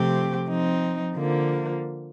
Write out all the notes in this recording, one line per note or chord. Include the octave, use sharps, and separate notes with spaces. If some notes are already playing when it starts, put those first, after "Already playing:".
Already playing: C3 F3 A3 C4 G4
F3 C4 D#4
D3 F3 A#3